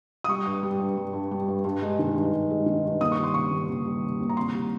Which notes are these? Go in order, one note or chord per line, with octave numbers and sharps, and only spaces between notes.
D#6
G3 C#6
G2
G3
G2
G3
G2
G3
G2
G2
G#3
D#3
G2
G2
G#3
D#3
G2
D#2 D#6
C#6
G3
C6
C#3 C#6
D#2
D#2
G3
C#3
D#2
A#5
C2 C6
G3